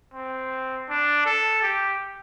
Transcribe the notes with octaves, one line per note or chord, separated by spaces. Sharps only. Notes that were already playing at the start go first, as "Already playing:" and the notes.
C4
D4
A4
G4